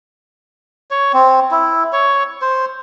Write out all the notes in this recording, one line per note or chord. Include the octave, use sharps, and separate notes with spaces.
C#5
C4
E4
C#5
C5